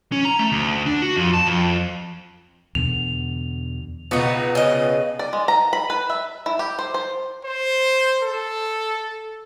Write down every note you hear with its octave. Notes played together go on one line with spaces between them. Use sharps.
C#4
A#5
A3
D2
D4
F#4
F2
A5
F2
E2 B2 D3 F7
C#2 B2 B3 D#4 C#6
C#3 D#5
D5
G#3
A#5
B5
B4
E5
E4
G4
C5
C5
C5
A4